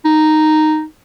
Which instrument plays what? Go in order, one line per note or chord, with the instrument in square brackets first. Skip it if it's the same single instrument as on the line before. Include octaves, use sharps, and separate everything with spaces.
[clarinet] D#4